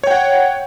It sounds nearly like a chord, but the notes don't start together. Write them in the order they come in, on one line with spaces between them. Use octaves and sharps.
C#5 G5 F#5